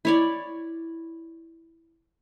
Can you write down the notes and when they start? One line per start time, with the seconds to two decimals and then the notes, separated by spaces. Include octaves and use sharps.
0.05 E4 C#5 D5